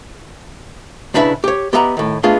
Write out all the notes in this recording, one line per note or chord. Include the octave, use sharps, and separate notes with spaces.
B1 C#3 D4 E4 B4 E5
G4 C#5
B3 G4 D#5 E5 F#5 A#5
A2 D#3
A3 B3 D4 F4 G#4 D#5